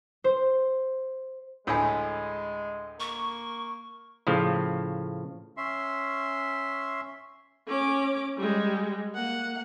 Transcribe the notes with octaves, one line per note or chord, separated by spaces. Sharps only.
C5
D2 A2 G#3 A#4 C#5 G#5
A#3 C#6
A2 C#3 F3
C#4 E5 C6
C#4 D6
G3 G#3
A#3 F#5